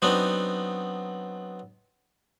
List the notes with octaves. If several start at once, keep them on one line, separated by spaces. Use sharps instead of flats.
F#3 B3 C4 D4 D#4